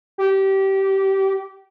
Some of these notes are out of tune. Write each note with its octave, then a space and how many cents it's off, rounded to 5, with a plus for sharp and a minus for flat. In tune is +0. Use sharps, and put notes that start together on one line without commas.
G4 -20